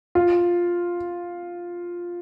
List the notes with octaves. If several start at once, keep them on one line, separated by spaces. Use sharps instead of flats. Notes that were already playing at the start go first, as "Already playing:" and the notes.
F4